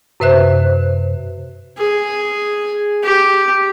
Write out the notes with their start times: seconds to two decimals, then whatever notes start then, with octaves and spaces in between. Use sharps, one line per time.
0.20 F#2 C3 B4 C5 E5 F#6
1.78 G#4
3.03 G4